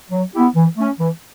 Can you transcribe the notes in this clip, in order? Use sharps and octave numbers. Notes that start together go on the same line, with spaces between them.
F#3
B3 E4 G4
E3
A3 C#4
E3